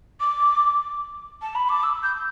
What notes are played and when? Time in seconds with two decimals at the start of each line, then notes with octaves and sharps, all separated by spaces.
0.20 D6
1.42 A5
1.55 B5
1.69 D6
1.83 E6
2.03 G6